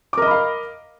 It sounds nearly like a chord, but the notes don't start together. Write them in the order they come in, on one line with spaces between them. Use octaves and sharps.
D6 A#4 D#5 B5 F5